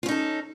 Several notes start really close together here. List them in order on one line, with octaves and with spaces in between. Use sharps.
F4 C#4 D#4 A4